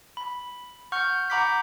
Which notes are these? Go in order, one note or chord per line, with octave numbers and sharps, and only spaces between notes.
B5
F#5 C#6 F6 G6
F#5 A#5 B5 D6 G6 B6